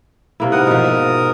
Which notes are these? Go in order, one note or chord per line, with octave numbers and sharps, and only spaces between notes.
C3 A#3 E4
G#2 A#4 F#5 D#6
B2 F3
E5